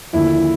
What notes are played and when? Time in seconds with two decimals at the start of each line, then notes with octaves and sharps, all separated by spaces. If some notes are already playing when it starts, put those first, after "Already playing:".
0.13 D#2 D3 F3 E4